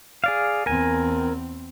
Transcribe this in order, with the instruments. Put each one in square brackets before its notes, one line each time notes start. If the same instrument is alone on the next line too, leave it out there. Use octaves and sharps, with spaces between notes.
[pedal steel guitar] G#4 D5 F5
[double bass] E2 C4 [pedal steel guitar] A#4 G#5